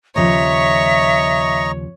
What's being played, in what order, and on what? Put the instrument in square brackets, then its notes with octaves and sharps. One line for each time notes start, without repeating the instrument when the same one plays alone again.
[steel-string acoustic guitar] D#2 C#3 F3 [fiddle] C#5 [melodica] D#5 A#5 C#6 [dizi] E5